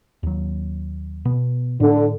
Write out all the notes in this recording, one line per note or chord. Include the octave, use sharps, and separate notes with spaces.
D#2 F#3
B2 B3
A2 D3